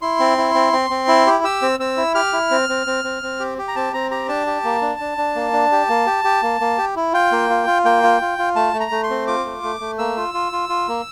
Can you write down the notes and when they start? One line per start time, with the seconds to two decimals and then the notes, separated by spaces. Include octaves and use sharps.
0.02 E4 C6
0.19 C4
0.38 E4
0.55 C4
0.73 C4
0.90 C4
1.08 E4
1.26 G4
1.44 G4 E6
1.62 C4
1.79 C4 E6
1.97 E4
2.15 G4 F6
2.33 E4
2.51 C4
2.69 C4
2.87 C4
3.04 C4
3.23 C4
3.40 G4
3.58 G4
3.68 A#5
3.76 C4 A5
3.93 C4 A#5
4.11 G4 A#5
4.28 D4 A5
4.47 G4
4.65 A#3
4.82 D4
5.00 D4
5.18 D4
5.36 A#3
5.53 D4
5.72 G4
5.89 A#3
6.06 G4
6.24 G4
6.42 A#3
6.61 A#3
6.78 G4
6.96 E4
7.13 F4 G5
7.32 A#3
7.50 F4
7.67 F4
7.85 A#3 G5
8.03 F4
8.21 F4
8.38 F4
8.56 A3 A5
8.74 A3
8.80 A#5
8.91 A3
9.03 C6
9.10 C4
9.27 F4 D6
9.45 A3
9.63 A3
9.80 A3
9.98 A#3 E6
10.17 F4
10.34 F4
10.52 F4
10.69 F4
10.88 A#3